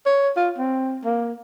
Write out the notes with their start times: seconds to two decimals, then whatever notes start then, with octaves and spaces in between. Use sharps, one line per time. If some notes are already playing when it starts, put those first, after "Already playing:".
0.06 C#5
0.37 F4
0.58 C4
1.04 A#3